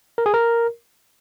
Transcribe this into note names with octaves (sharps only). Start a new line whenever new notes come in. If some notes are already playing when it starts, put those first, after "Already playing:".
A#4
G#4
A#4